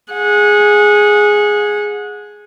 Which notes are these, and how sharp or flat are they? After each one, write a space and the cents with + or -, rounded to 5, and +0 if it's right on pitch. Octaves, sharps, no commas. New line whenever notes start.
G#4 +0 F#5 -25